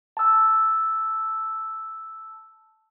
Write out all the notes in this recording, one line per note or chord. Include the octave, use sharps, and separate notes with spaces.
A5 E6